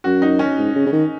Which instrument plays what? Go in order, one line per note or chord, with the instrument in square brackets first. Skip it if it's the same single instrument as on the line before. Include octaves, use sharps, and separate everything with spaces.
[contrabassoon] F#2 [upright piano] F#4
[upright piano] D#4
C#4
[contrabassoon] G#2
C#3
C#3
D#3